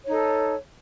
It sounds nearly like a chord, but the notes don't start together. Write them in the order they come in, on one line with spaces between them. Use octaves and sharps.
C#5 D#4 A4